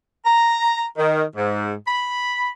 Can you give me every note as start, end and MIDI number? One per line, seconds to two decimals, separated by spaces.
0.25 0.84 82
0.97 1.22 51
1.35 1.72 44
1.87 2.49 83